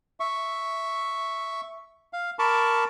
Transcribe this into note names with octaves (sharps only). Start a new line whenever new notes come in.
E5 C#6
F5
A#4 A5 B5 C#6 D6